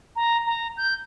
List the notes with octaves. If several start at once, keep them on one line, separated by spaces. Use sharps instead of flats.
A#5
A#5
G6